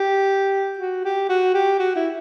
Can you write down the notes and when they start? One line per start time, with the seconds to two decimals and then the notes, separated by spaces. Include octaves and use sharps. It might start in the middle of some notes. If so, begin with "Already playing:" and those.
Already playing: G4
0.79 F#4
1.05 G4
1.29 F#4
1.54 G4
1.79 F#4
1.96 E4